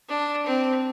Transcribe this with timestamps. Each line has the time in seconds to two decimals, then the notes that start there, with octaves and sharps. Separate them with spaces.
0.09 D4
0.46 C4